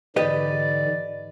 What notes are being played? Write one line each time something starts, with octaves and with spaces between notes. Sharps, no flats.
G#2 D3 E3 G4 B4 D5 D#5